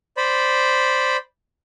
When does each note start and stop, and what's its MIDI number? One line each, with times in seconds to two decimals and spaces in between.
0.17 1.17 72
0.17 1.17 74
0.17 1.17 83